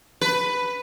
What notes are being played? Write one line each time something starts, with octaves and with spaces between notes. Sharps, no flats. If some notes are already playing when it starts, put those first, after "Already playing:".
B4